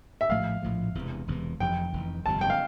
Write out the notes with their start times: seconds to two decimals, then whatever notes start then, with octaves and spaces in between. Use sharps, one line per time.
0.21 E5
0.29 A#1 A2 F3 A3 F5
0.62 A#1 A2 F3 A3
0.95 E1 E2 C3 E3
1.27 E1 E2 C3 E3
1.60 F1 F2 E3 G5
1.93 F1 F2 E3
2.26 G1 F2 C3 A5
2.41 G5
2.50 F5